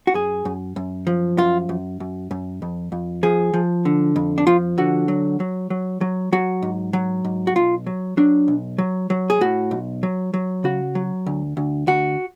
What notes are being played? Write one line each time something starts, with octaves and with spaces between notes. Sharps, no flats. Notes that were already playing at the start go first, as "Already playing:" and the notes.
F#4
F#2 G#4
F#2
F#2
F3
F#2 F4
F#2
F#2
F#2
F2
F2
F3 G#4
F3
D3
F2
D4
F3 F4
D3 F#4
F#3
F#3
F#3
F#3
F#3 F#4
G#2
F#3
G#2
F#4
B1 F4
F#3
F#3 D4
B1
F#3
F#3
G#4
A2 F#4
B1
F#3
F#3
C#3 F#4
F#3
D2
D2
D2 F#4